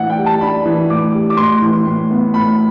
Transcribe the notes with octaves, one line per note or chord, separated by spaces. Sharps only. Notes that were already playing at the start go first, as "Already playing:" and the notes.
Already playing: A2 E3 D4 F#5
G5
G3
A5
D4 B5
E3
A2 D6
G3
D6
A2 C6
E3
A2
B3
A2 B5